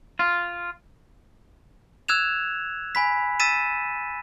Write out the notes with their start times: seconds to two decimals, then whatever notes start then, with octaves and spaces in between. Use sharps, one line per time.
0.19 F4
2.08 E6 F#6 G#6 E7 F7
2.95 G#5 B5 B6
3.40 E6 A6 B6 D#7 E7